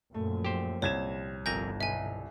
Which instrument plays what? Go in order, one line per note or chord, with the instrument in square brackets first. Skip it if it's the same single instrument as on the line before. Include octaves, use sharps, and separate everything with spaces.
[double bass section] F#2 A#2 F3 [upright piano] A3
[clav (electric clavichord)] G4 C5
[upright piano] C2 G#6 E7 [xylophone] C#5
[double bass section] G1 [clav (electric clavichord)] F2 A#4 G#5 [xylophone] G6 A#6
[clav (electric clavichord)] B1 [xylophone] E5 G#5